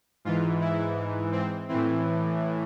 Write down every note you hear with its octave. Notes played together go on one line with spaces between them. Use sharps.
G#2 E3 F4
E4
C4
A2 E3 C4